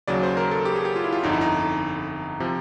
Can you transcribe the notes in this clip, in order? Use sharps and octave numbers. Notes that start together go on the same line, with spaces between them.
D#2 C#3 F#3 D5
C5
A#4
A4
G4
G#4
G4
F4
E4
F4
G1 F2 D3 D#4
E4
D#4
C3 F3